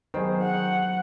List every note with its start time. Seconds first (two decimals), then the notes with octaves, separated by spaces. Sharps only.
0.14 D#3 F#3 B3 G#4 C5
0.42 F#5